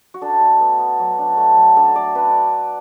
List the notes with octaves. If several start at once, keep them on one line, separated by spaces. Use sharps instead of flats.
F#4
D4 A4
A3
B3
B3
F#3
D4
A3
F#3
D4 A4
A3 D5
D4 B4